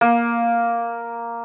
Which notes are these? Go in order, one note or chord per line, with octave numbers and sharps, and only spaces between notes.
A#3